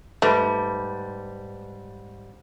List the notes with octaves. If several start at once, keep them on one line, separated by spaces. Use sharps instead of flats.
G#2 G3 A3 B4 A5 B5